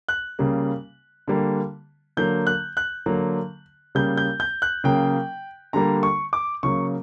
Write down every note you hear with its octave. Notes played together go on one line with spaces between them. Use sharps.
F#6
C#3 G3 A#3
D3 G3 A#3
D3 F#3 A#3 G6
F#6
F#6
D3 F#3 A#3
C#3 G3 A#3 G6
G6
G6
F#6
C#3 F#3 A#3 G5
D3 G3 A#3 A#5
C#6
D6
C#3 F#3 A#3 C#6